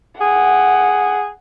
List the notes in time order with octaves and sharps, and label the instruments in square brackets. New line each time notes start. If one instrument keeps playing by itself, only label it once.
[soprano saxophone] G#4 [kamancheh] F#5